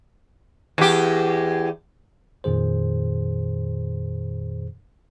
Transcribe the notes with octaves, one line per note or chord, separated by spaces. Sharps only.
E2 G4
F2 A#2 D#3 G#4 C5